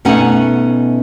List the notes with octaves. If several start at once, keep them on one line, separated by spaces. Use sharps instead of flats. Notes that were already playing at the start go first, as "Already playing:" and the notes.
B2 A3 C#4 D#4 F#5 G#5